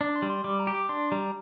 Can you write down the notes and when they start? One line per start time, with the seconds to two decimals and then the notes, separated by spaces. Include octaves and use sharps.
0.01 D4 D6
0.16 C6
0.22 G3
0.30 C6
0.44 G3 D6
0.59 A#5
0.67 G4
0.75 D6
0.89 D4 C6
1.11 G3 A#5